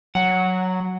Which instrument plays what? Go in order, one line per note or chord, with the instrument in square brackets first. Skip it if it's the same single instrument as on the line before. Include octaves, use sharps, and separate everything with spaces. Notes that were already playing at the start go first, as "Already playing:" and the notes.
[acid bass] F#3 [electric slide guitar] F#5